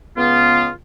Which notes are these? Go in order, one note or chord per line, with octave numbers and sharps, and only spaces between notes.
C#2 B3 F4